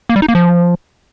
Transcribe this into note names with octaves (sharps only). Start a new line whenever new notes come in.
A#3
G3
D#4
A#3
F3